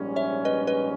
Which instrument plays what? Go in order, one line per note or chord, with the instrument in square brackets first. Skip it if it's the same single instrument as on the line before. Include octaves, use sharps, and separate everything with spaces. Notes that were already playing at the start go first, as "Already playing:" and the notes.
Already playing: [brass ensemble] A#1 G#2 G3 C#4
[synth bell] C#5 E5
B4 D#5
B4 D#5